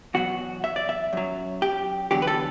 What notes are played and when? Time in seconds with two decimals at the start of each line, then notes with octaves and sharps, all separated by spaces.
0.14 E2 B2 F#3 F#4
0.64 E5
0.76 D5
0.89 E5
1.13 F#2 F#3
1.62 G4
2.11 E2 D3 F#3 G4
2.22 B4
2.27 A4